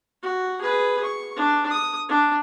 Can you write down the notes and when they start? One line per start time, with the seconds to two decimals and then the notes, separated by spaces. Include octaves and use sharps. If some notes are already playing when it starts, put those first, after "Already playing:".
0.23 F#4
0.61 G#4 B4
1.04 C#6
1.36 D4
1.70 D#6
2.08 D4